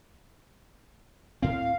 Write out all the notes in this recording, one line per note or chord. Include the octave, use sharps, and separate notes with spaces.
D2 A2 C4 F5